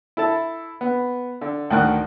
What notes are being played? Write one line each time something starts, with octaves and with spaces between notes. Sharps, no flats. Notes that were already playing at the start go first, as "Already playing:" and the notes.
E4 A4 A5
B3
D3
D2 A2 D#3 F#5 F#6